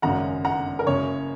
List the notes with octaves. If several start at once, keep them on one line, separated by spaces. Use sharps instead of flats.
G#1 F#2 C#3 F#5 A#5
F#5 A#5
A#4
F#1 F#2 C#3 C#5